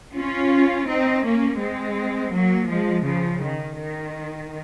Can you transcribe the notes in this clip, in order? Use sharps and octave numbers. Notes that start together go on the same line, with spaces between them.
C#4 F4
C4 D#4
A#3 C#4
G#3 C4
F#3 A#3
F3 G#3
C#3 F3
D#3
D#3